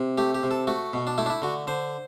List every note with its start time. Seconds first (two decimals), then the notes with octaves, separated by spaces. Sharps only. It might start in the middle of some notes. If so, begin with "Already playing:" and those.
Already playing: C3
0.18 A3 G4
0.35 G4
0.43 C3
0.51 A4
0.67 A3 F#4
0.93 B2
1.07 D4
1.18 A3 E4
1.26 D4
1.30 E4
1.42 D3 F#4
1.67 D3 C5